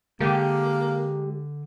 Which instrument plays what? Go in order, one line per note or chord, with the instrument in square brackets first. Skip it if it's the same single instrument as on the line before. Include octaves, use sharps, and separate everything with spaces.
[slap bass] D3 [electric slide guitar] G#3 [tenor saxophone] A#3 [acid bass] G4